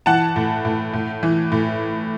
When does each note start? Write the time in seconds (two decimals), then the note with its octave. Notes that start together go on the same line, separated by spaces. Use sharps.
0.06 E3 F#5 A5
0.36 A2
0.65 A2
0.93 A2
1.23 E3
1.52 A2